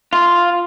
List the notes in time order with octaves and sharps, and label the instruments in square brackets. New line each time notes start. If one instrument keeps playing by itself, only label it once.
[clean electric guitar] F4